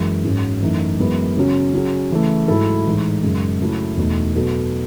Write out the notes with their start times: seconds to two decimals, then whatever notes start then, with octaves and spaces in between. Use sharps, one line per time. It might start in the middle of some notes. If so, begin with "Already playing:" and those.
Already playing: F#2 E3 G#3
0.24 G#2 F#3 C#4 F#4
0.62 F#2 E3 A3 D#4
0.98 F#2 E3 G#3 B3 E4
1.37 C#3 F#3 C#4
1.73 C#3 F#3 C#4 G#4
2.11 C#3 E3 A3
2.48 G#2 F#3 A3 E4 A4
2.86 A2 E3 G#3 D#4
3.23 F#2 C#3 G#3
3.60 C#3 F#3 A3 C#4 E4
3.97 E2 B2 A3 D#4
4.35 B2 F#3 B3 F#4 A4